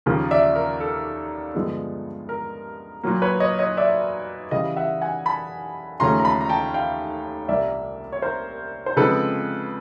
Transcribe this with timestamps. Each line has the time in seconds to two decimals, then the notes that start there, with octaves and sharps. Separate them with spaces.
0.06 D#2 C#3 F3 A#3
0.31 D5 E5
0.56 A#4
0.80 A4
1.54 G2 D3 F3 G#3 B3
2.29 A#4
3.03 A#2 F#3 A#3
3.22 B4 C#5
3.40 C#5 D#5
3.59 C#5 D#5
3.77 D5 E5
4.51 C#3 E3 G3 D#5 F5
4.76 E5 F#5
5.01 F#5 G#5
5.26 A5 B5
6.00 D#2 C#3 F3 A3 C#4 A#5 C6
6.19 A#5
6.25 A5 B5
6.41 A#5
6.49 G5 A5
6.74 F5 G5
7.48 C2 A#2 G3 A#3 D5 E5
8.12 C#5
8.22 A#4 C5
8.86 C5
8.97 C#3 F3 G#3 C4 A4 B4